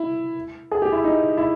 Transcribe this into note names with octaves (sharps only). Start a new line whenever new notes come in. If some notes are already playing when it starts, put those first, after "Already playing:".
Already playing: E4
G#4
G4
E4
D#4
E4